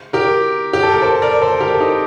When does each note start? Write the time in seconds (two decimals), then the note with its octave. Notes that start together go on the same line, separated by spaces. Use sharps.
0.13 G4 A#4
0.73 G4
0.83 A4
0.92 A#4
1.02 A4 C5
1.22 A#4 D5
1.42 A4 C5
1.60 G4 A#4
1.75 A4
1.81 D#4 G4